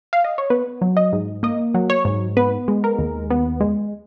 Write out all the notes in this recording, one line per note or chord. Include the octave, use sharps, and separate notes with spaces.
F5
D#5
C#5
B3 B4
F#3
D#5
G#2
A#3 D#5
F#3
C#5
G#2
B3 B4
G#3
A#4
D#2
B3
G#3